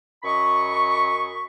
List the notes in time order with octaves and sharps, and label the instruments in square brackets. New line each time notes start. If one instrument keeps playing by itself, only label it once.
[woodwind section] F#2 D#5 B5 C#6